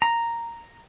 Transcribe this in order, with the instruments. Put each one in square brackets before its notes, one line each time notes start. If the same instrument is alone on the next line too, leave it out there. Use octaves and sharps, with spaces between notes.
[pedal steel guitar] A#5